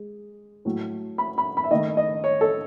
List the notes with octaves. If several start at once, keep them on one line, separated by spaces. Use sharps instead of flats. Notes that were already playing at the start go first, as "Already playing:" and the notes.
Already playing: G#3
A2 F#3 A3
B5
B5
B5
E5
D#3 A3 D#5
D#5
C#5
A4